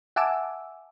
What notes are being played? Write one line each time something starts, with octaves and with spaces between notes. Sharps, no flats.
E5 F#5 G#5 A5 D6 E6